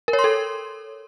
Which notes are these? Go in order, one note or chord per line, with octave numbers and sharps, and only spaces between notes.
A#4
C#5
C6
A4